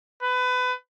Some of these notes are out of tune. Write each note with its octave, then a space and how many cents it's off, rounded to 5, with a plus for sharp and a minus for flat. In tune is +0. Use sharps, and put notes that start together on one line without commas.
B4 +25